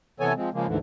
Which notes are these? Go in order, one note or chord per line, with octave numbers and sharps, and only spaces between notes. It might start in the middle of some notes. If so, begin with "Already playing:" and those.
C3 E3 B3 A4 C#5 G#5
F3 G#3 C4
C#3 F3 G#3 A#3
D2 G#2 D3 E3